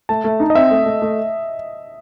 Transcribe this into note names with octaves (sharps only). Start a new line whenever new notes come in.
A3 A5
A3
D#4
D#5
C4 E5
A3
A3
A3